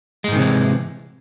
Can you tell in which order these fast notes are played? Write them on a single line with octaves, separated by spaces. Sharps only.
G#3 G#2 D#3 C3 E3